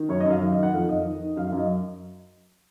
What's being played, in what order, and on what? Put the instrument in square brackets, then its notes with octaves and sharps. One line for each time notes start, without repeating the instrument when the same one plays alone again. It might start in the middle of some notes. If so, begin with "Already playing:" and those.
Already playing: [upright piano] D#3
F#2 C#5
D#5
F#2 F5
D#3
D#3 D#5
F#5
F2 F5
F2 D#5
D#3
D#3
F#2 F5
F5
F#2
D#5